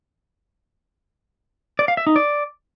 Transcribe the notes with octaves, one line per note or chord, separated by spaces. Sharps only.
D5
F5
E5
D#4
D5